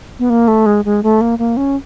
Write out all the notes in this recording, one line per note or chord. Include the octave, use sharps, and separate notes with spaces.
B3
A#3
A3
G#3
G#3
A3
A#3
A#3
C#4